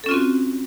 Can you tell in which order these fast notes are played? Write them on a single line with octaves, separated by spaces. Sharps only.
A4 C#4 F4 C4 F#4